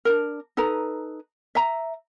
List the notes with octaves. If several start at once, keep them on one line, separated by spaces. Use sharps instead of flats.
D4 D#4 A#4
D#4 A4 B4 A#5
E5 A#5